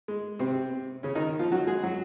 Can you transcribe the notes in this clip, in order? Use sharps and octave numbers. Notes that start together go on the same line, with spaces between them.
G#3
C3 C4
C#3 C#4
D#3 D#4
F3 F4
F#3 F#4
G#3 G#4
F#3 F#4